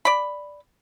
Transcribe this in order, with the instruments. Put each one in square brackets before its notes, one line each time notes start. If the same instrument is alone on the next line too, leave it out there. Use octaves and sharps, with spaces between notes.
[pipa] D5 B5